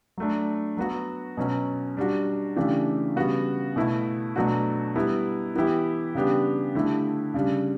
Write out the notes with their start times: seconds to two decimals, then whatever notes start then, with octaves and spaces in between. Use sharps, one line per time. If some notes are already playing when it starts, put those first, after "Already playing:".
0.17 F#3 A3 D4
0.77 F#3 B3 F#4
1.37 B2 F#3 C#4
1.97 G3 D4 F#4
2.56 C#3 E3 A3 D4 G4
3.16 C#3 G3 B3 F#4
3.76 B2 A3 E4
4.36 B2 F#3 A3 D4 F#4
4.95 G3 B3 E4
5.55 E3 B3 E4 G4
6.15 C#3 G3 B3 D4 G4
6.75 D3 A3 E4 G4
7.34 C#3 G3 D4